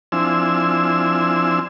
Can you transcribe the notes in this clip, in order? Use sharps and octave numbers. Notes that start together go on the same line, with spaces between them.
F3 C4 D4 E4 G#5 E6